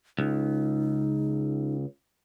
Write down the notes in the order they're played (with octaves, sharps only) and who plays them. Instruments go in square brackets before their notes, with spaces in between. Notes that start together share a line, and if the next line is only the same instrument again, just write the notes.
[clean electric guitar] C#2 [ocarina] D#4